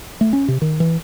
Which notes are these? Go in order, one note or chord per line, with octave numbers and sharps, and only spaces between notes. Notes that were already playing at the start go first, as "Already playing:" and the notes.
A3
C#4
C3
D#3
E3